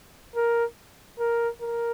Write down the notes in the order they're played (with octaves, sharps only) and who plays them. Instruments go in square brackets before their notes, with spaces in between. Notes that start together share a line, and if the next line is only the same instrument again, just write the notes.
[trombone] A#4
A#4
A#4